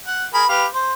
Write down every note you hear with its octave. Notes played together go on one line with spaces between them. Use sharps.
F#5
G#4 A#4 B5
G4 B4 F5
C5